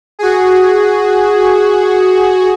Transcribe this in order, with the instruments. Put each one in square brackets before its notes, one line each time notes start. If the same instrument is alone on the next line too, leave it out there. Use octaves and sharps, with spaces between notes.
[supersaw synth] F#4 G#4